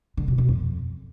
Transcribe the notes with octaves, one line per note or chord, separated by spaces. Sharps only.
D3
B2
B2
F2